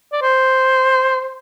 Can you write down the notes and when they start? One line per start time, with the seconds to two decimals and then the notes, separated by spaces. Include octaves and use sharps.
0.13 D5
0.22 C5